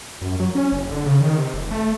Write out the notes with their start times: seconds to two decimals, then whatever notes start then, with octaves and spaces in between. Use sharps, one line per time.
0.21 F#2
0.40 F#3
0.55 C#4
0.72 F#1
0.91 D3
1.06 C#3
1.21 D#3
1.38 C3
1.54 F1
1.71 A3